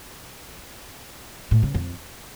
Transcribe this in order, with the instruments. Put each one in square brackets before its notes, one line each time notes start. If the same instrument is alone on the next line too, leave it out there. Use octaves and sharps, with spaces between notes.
[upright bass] A2
C#3
F2